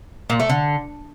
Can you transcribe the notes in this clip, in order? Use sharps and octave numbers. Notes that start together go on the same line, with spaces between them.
A#2
A3
D3